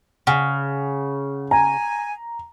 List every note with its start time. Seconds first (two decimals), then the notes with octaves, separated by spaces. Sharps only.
0.27 C#3 F#5
1.51 G#5 A#5